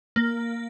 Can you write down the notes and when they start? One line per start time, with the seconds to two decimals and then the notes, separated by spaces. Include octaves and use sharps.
0.16 A#3